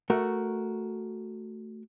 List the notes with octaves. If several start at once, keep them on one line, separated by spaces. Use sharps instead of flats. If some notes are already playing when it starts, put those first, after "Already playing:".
A3 F#4 A#4